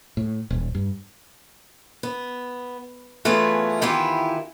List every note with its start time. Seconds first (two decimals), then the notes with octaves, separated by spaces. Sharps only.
0.17 A2
0.50 D#1
0.75 G2
2.03 B3
3.25 E3 A3 B3 C#4 F4 G#4
3.81 D#3 E3 B3 E4 F4 G4